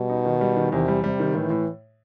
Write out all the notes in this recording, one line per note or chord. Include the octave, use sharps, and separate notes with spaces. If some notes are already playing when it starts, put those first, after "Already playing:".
Already playing: B2 G3
D#4
D#3
G3
D#3
E2 C3
G3
C3 G3
D#3
A2 E3
A2